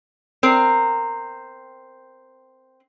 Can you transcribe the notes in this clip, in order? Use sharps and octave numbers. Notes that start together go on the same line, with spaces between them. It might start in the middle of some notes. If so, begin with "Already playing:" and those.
C4 A#4